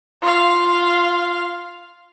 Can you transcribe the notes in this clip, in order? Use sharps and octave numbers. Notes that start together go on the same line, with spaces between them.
F4 F5